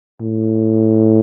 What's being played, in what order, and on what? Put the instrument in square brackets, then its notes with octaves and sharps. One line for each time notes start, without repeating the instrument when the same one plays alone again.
[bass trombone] A2